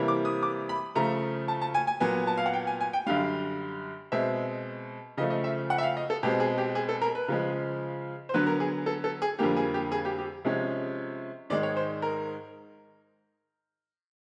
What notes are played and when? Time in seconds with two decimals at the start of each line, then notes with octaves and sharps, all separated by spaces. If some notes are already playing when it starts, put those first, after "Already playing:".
Already playing: C3 E3 G3 A#3
0.08 D6
0.25 D#6
0.43 D6
0.69 B5
0.95 C#3 F3 A3 A#5
1.48 A5
1.62 A5
1.74 G#5
1.87 G#5
2.00 A#2 F#3 B3 G#5
2.27 A5
2.38 F5
2.46 F#5
2.53 G5
2.67 G#5
2.81 G#5
2.93 G5
3.07 F#2 D3 G3 F5
4.12 B2 G#3 C4 E5
5.17 C#3 F3 A3 D#5
5.30 D#5
5.44 E5
5.70 F#5
5.78 E5
5.83 F5
5.97 D#5
6.10 A4
6.23 B2 G#3 C4 G4
6.40 G#4
6.58 G4
6.75 G#4
6.89 A4
7.02 A#4
7.15 B4
7.28 C#3 F3 G#3
8.29 C5
8.34 D3 F#3 B3 B4
8.47 A#4
8.60 G#4
8.86 A4
9.04 A4
9.22 G#4
9.39 F2 D3 G3 A#3 G4
9.57 G#4
9.74 G4
9.92 G#4
10.05 G4
10.18 G4
10.45 C3 F3 G#3 C#4
11.50 G#2 D#3 G#3 D5
11.63 C#5
11.77 C5
12.02 A#4